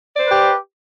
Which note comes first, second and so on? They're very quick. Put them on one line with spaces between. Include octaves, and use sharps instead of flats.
D5 C5 B4 G4